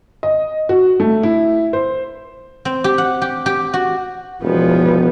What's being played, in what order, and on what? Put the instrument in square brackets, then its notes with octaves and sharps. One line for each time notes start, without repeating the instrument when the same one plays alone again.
[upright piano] D#5
F#4
A3
E4
C5
[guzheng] C4
G4
F#5
G4
G4
F#4
[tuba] E1 [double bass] F3 B3